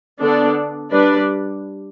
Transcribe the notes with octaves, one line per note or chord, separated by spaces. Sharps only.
D3 B3 D4 A4 D5
G3 D4 B4 D5